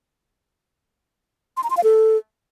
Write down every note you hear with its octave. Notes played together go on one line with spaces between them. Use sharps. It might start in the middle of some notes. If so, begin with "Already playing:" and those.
C6
A#5
C6
F5
A4